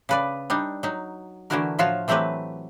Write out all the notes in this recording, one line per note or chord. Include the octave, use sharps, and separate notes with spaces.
C#3 B4 D5
G3 D4 D#4
F#3 D#4
D3 E3 A3 E4 F#4 A#4
A2 F3 F4 F#4 C#5 A5
E3 F#3 A3 C4 G4 B4